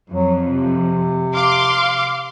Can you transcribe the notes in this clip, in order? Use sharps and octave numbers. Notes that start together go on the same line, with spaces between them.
F2 F#3
C3
F5 C6 D6